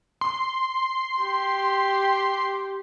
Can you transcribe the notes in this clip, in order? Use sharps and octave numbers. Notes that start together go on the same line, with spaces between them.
C6
G4